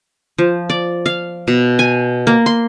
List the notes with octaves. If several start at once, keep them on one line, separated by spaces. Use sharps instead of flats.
F3
D5
F5
B2
G#5
A#3
C6